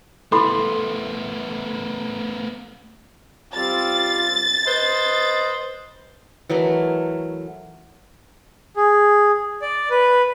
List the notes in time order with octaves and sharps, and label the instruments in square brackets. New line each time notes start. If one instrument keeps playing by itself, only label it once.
[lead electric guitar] A3 B3 [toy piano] E4 A4 [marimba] B5 [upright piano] C6
[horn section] G3 C4 F4 [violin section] A6
[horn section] B4 C5 D#5
[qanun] E3 F#3 A3 A#4
[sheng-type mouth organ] G#4
D5
B4